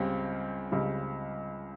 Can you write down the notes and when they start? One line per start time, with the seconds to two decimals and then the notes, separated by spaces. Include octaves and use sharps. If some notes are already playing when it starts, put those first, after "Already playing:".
Already playing: C#2 C#3 G3 C4 G4
0.71 C#2 C#3 G3 C4 G4